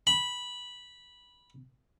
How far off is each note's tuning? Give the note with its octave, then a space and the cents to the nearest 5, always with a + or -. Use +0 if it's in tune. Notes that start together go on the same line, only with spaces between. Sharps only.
B5 -10